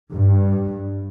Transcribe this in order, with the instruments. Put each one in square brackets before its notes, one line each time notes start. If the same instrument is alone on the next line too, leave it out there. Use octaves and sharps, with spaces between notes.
[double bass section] G2